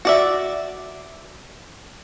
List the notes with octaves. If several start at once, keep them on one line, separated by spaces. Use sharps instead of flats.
F#4 D5 E5